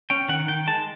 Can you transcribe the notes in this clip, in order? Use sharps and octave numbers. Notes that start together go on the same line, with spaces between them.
C#4 G5
D#3 F#5
D#3 G5
G#3 A5